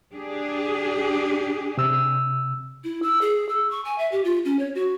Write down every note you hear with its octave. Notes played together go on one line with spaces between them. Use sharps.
D4 G4 G#4
C3 E6
E4
E6
G#4
E6
C#6
G#5
E5
G4
F4
C#4
C#5
F#4